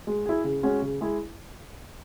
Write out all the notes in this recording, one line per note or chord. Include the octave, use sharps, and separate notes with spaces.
G#3
E4 G#4
C#3
G#3 C#4 F#4
C#3
G#3 E4 G#4